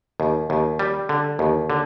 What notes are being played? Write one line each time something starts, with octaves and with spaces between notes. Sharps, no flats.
D#2
D#2
G3
D3
D#2
D3